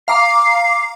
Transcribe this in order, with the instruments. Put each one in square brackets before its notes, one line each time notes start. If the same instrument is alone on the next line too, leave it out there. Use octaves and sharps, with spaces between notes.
[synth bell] F5 A#5 D6 [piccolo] C7